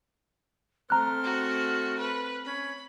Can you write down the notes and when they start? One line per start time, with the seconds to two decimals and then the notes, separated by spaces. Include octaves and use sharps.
0.90 A3 C4 A#5 F6 F#6
1.23 F#4
1.98 B4
2.45 C#4 B5